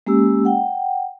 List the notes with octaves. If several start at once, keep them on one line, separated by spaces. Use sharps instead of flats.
G#3 A#3 C#4 G4 E6
F#5 G5